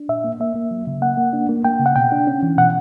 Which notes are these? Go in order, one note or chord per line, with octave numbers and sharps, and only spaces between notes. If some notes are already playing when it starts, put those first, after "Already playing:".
Already playing: D4
A#2 E5
A#3
A#3 E5
A#3
F#3
C#3
A#3 F#5
A#3
D4
A#3
A#3 G5
C#3
F#5
B2 G5
D4
C#4
E3
B2 F#5